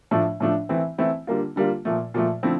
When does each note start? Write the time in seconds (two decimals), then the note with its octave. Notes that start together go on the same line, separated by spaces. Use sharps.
0.11 A2 F3 A3 D4
0.40 A2 F3 A3 D4
0.69 E3 A3 C4 E4
0.98 E3 A3 C4 E4
1.27 D3 G3 A#3 F4
1.56 D3 G3 A#3 F4
1.85 A#2 F3 A3
2.14 A#2 F3 A3
2.43 D3 F3 A3 C4 E4